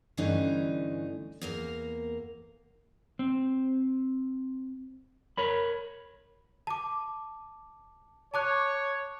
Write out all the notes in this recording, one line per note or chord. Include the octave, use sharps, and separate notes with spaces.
G2 D3 E3 A3 C#4 D#4
E2 A#3 A#4
C4
A#4 C#5 B5
A5 D6
C#5 A5 D6 F#6